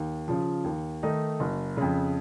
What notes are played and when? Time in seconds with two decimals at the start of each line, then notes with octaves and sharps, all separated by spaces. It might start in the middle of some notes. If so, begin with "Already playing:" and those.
Already playing: D#2
0.28 C#3 F3
0.64 D#2
1.03 D#3 A3 D#4
1.40 F#1
1.77 F2 C#3